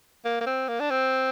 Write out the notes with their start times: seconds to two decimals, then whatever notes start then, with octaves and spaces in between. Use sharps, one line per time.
0.25 A#3
0.41 A#3
0.46 C4
0.68 A#3
0.80 D4
0.91 C4